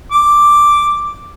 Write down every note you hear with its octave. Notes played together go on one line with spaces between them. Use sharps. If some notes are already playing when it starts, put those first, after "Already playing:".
D6